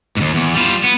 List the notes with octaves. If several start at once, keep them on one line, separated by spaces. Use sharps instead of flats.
D#2 G#2
E2
G3 F4
B3